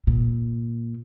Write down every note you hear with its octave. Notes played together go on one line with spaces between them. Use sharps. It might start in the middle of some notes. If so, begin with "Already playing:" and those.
A#2